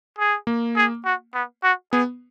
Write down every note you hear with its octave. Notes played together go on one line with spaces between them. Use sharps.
G#4
A#3
G#4
F#4
B3
F#4
B3 G#4